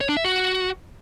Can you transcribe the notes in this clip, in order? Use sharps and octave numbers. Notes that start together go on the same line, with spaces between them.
C#5
D4
E5
F#4